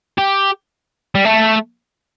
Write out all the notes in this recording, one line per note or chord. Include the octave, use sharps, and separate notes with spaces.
G4
G3
A3